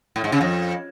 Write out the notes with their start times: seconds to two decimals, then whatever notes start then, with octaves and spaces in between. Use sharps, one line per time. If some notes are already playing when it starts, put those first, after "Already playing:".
0.16 A2
0.24 G#2
0.32 C#3
0.41 F2